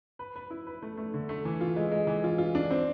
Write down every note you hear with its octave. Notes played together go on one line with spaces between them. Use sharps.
B4
B4
E4
B4
A3
A3
D3
A3
E3
F4
G#3
G#3
E3
F4
F4
D4
C4